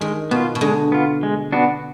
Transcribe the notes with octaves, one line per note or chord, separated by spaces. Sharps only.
D#3 G#3
B2 B3 F4
B2
D3 G#3
B3 F4
G#3
B3 D4 F#4